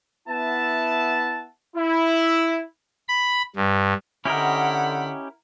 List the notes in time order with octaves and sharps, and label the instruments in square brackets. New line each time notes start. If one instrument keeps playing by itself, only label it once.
[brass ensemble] B3 E4 E5 F#5 A5
E4
[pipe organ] B5
G2
[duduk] D3 [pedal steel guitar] C#4 G4 D#5 [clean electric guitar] E4 A#4 [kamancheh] F#5 B5